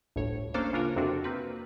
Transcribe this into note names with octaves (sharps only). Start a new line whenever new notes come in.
G1 D2 A2 C#5
A#3 C#4 D4 A4 C5 F5
C#3 D4 F4 F#4 A#4 C#5
F2 C3 C4 D4 F#4
A#3 C4 B4